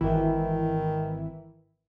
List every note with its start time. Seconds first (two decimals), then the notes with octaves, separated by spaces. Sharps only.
0.01 G#1 D#3 E3 E4